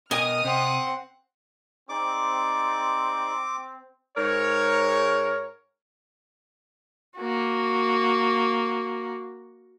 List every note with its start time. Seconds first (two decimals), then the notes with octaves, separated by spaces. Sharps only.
0.11 B2 A#4 D#5 G5 G#5 D#6 F6
0.44 C3 C4 F#5
1.89 C4 D#4 G#4 D5 D6
4.17 G#2 A#4 C#5
7.17 A#3 F#4